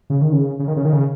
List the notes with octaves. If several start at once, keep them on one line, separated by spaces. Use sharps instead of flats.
C#3
D#3
C#3
C#3
D#3
C#3
D#3
C#3